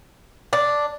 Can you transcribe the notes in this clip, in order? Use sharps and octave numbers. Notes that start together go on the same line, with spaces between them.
D4